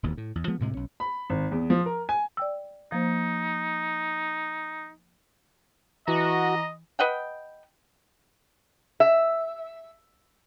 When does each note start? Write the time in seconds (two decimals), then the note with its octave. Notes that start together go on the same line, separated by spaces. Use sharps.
0.03 E1 D#2 B2
0.17 A2
0.35 E2
0.48 F3 G#3 B3
0.60 D2 A2 C3 G#3
0.74 B1 C#4
1.00 B5
1.30 G#1
1.51 E2
1.70 F3
1.86 A#4
2.09 G#5
2.37 D5 G5 E6
2.92 F3 A#3 D#4 C5
6.08 E3 F#4 D#5 A#5
6.99 B4 D#5 F#5 G5
9.00 E5